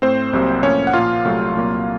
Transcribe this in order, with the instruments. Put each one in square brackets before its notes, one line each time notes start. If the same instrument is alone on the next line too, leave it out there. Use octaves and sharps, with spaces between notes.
[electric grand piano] A2 A3 C4 C5
C2 C3 F#3 A#3
A2 F3 A#3 C#4 C#5
F#5
A#2 F3 A#3 F4 F5
C2 C3 F#3 A3
C2 A#2 F#3 A#3